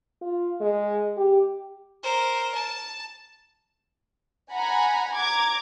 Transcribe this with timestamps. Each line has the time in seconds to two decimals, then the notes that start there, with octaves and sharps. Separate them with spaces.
0.21 F4
0.60 G#3
1.17 G4
2.03 A#4 C5
2.54 A5
4.52 F#5 G#5 A#5 B5
5.15 A#5 D6 G#6